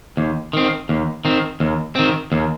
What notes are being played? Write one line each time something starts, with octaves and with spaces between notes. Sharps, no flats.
D#2
D#3 C4
D#2
D#3 C4
D#2
D#3 C4
D#2